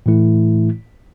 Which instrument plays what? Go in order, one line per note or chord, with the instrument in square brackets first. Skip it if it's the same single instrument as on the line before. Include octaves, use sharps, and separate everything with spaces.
[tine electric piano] A2 E3 A3 E4